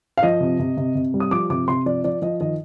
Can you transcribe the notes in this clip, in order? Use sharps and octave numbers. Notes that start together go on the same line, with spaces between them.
F5
F3 D#5
C3
C3
C3
C3
G3
D#6
F3 D6
C3 D6
C3 C6
F3 D5
F3 D5
F3 D#5
D#3 D#5